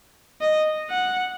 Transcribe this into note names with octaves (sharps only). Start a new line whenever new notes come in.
D#5
F#5